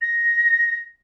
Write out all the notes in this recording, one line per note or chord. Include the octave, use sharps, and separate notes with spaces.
A#6